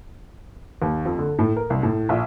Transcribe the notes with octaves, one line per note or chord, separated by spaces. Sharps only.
D#2
F2
D3
A2
A#4
C2
A2
A#1